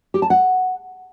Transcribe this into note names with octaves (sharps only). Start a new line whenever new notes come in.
G4
A5
F#5